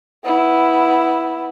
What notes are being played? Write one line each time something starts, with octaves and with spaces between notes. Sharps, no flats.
B3 E4